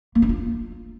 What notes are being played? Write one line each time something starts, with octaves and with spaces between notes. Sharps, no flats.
A#3
D4
F4